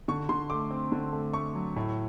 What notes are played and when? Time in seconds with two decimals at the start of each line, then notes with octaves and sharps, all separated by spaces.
0.08 D3 C#6
0.29 D3 C6
0.50 A3 D6
0.71 C4
0.92 D3
1.13 A3
1.33 A3 C#6
1.55 F#3
1.76 A2